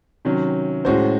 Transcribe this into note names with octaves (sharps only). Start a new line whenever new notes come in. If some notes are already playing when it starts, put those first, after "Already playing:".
C3 D#3 F#3 C#4
A2 G#3 C#4 F#4 C5